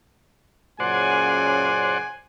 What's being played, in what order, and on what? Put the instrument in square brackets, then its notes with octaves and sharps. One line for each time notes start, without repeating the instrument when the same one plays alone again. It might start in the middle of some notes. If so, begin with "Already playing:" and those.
[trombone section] F#2 A#2 C#3 [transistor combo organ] C5 D5 F#5 [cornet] G#5